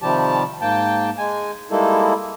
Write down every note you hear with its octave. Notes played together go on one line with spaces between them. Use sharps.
C3 D#3 F3 G3 G4 A5
G#2 A#3 G5 A5
G#3 G#5
G3 G#3 A#3 D#4 E4 A4